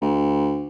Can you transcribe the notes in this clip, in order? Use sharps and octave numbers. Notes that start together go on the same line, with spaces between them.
D2